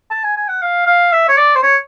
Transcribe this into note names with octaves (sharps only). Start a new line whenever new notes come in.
A5
G#5
G#5
F#5
F5
F5
E5
C#5
D5
C5
C#5